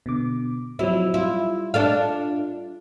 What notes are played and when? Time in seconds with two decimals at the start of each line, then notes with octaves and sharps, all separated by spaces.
0.06 B2 D3 D6
0.79 F3 F#3 C4 E4
1.14 G3 E4 F4
1.74 D4 A4 F5